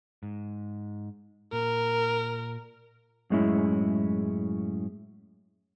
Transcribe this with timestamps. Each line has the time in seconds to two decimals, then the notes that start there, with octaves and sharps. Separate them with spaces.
0.23 G#2
1.53 A#2 A#4
3.30 F#2 A2 G#3 C#4 E4